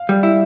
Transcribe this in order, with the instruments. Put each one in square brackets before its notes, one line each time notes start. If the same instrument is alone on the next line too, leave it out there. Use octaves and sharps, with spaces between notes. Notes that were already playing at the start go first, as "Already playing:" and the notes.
Already playing: [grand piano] F5
[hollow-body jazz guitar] G3
E4